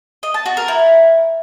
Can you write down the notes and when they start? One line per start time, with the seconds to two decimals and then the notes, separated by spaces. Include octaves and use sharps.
0.23 D#5
0.34 A5
0.46 F#4
0.57 A#4
0.68 E4